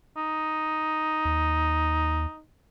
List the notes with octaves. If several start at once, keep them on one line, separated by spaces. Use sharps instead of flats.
D#4
D#2